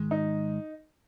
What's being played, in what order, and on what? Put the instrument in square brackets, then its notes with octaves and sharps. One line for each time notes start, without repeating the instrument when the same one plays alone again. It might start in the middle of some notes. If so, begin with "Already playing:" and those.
Already playing: [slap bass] G#2 D#3 G#3
[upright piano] D#4